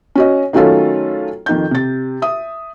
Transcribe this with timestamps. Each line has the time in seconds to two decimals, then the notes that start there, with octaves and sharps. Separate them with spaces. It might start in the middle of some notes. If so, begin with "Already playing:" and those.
0.15 C#4 F#4 D#5
0.53 D#3 F#3 A3 C#4 F4 A4
1.46 F2 D#3 G6
1.71 C3 A6
2.22 E5 D#6